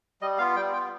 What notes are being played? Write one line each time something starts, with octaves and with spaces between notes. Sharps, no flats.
G3 D#5
B3 F4 F5
G3 G5
B3 F4 G5